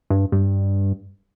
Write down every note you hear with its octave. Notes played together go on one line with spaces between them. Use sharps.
G2
G2